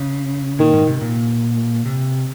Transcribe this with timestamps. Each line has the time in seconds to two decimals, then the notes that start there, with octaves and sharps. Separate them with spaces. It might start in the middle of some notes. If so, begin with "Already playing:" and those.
Already playing: C#3
0.59 A#2 D#3
0.73 G#2
0.87 C3
1.01 A#2
1.85 C3